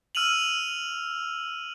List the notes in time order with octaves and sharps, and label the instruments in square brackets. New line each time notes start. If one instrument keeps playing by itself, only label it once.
[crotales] E6 F6 D#7 F7 F#7